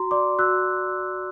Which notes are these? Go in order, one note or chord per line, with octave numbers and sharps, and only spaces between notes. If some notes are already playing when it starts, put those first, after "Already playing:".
Already playing: F#4 A#5 C6
D5 C6 D6
F#4 E6 F#6